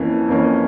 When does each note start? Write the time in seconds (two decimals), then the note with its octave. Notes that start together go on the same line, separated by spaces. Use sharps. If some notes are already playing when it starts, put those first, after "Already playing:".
Already playing: F2 E3 A#3 C#4
0.29 F2 E3 A#3 C#4